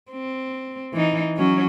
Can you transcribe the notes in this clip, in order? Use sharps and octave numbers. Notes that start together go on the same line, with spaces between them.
C4
E3 D#4
F#3 C#4